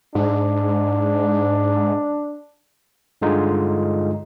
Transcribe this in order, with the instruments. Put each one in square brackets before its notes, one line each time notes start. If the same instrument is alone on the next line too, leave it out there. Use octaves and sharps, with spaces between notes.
[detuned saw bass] G#2 [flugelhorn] D4
[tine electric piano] G2 D3 G#3 D#4 F4